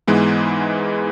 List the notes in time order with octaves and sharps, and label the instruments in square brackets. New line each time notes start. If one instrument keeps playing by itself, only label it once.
[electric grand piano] G#2 E3 G#3 B3